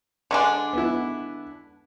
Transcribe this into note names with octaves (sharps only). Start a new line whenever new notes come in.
D3 G#3 D4
B3 E4